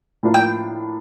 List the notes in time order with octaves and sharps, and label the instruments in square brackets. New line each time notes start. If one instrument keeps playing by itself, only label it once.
[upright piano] A2 F3 A#3 D4 F4
[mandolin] G5